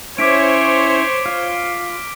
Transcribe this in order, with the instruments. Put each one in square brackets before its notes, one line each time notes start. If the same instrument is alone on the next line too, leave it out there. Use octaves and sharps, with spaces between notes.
[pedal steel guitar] C#4 E4 [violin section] C5 C#5 [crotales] D6 B6 D7
[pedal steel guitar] F4 [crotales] F6